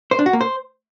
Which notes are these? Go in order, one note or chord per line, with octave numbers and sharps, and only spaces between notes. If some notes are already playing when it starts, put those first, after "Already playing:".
C5
D4
F#4
A#3
C5